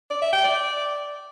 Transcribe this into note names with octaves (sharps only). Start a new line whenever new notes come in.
D5
E5
G5
D5